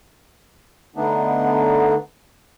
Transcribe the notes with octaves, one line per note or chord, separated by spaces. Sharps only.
D3 A3 B3 D4 D#4